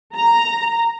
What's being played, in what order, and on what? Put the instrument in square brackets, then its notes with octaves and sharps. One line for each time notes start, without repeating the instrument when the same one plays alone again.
[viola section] A#5